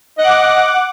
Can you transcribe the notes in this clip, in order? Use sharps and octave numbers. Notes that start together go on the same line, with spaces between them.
D#5 F#5 D6